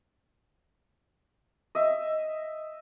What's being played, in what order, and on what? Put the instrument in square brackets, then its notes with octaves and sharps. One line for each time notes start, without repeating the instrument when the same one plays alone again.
[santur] D#5 E5